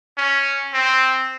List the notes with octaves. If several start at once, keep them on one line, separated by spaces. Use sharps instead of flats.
C#4
C4